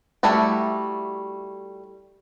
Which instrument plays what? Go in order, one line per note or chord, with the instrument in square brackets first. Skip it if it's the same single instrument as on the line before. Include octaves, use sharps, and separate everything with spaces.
[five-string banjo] G3 A3 E4 F#4